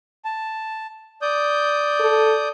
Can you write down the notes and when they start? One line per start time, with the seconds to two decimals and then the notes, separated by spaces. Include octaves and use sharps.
0.25 A5
1.22 D5 D#6 G6
2.00 A4